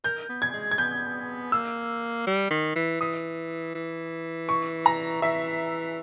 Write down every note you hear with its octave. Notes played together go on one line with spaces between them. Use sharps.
A#4 G6
B3
G#6
G#3
G#6
B3 G6
A#3 E6
G3
D#3
E3
E3 D#6
E3
C#6
A#5
E3 E5